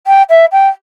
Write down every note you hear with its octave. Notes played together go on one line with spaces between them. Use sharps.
G5
E5
G5